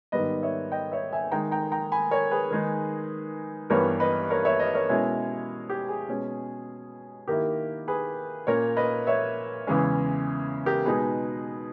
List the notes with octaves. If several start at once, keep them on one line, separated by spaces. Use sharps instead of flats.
G#2 D#3 G3 B3 B4 D#5
C#5 E5
D#5 G5
C#5 E5
E5 G#5
D#3 G#3 D#4 G5 A#5
G5 A#5
G5 A#5
G#5 B5
A#4 C#5
G#4 B4
D#3 G#3 D#4
G2 E3 G3 B3 A#4 C#5
B4 D#5
A#4 C#5
C#5 E5
B4 D#5
A#4 C#5
B2 G#3 C#4 E4
G4
G#4
B2 G#3 C#4
D#3 A#3 E4 G4 A#4
G#4 B4
A#2 A#3 C#4 A#4 C#5
B4 D#5
C#5 E5
E2 C#3 E3 G#3 C#4
G4 A#4
B2 G#3 D#4 G#4 B4